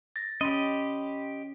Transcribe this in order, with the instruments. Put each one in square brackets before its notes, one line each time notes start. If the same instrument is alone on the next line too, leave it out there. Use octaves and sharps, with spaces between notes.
[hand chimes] A6 A#6
[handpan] C#4 [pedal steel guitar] G4 D#5 [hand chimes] B5 C6